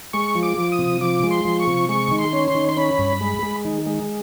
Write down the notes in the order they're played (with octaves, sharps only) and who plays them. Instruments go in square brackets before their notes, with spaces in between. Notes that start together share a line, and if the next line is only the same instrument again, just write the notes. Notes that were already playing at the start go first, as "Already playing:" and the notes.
[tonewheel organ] G#3 C#6
F3
D6
F3
D#6
C3
F3 D6
G#3
C6
F3
C#6
C3
G#3 C#6
D#3
C6
C#4
C6
D#3
C6
C#4 B5
G2
G#3
G#3
D#3
G#3